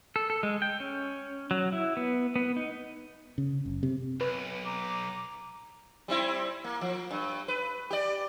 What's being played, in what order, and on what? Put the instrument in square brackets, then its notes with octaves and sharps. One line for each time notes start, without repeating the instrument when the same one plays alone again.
[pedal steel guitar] A4
A4
G#3
G5
C#4
F#3
E4
B3
B3
D#4
[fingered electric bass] C#3
F#1
C3
[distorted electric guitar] B1 [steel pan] B4
[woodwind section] A#5 D6
[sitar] G3 C4 E4
A#3
F3
G2
B4
G4 D5